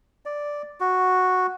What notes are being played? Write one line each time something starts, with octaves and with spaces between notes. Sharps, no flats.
D5
F#4